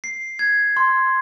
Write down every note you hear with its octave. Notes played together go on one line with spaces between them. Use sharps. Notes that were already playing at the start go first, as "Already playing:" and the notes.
C7
G#6
C6